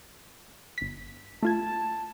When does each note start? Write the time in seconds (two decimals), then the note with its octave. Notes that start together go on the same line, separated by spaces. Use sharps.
0.78 G1 B6
1.43 A3 F4 A5 G#6